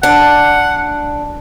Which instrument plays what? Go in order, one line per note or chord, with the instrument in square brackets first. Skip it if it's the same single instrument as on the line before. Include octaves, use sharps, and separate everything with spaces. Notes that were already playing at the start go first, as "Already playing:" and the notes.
[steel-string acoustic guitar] D4 [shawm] F#5